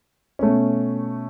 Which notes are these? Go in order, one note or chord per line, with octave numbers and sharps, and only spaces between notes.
B2 A3 C#4